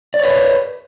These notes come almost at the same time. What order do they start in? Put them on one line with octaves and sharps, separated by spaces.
D5 C#5 B4